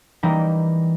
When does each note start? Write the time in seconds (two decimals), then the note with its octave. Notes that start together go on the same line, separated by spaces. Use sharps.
0.23 E3 G3 A#3 D#4